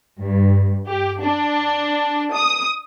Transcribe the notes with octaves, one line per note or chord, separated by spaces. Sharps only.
G2
G4
D4
D#6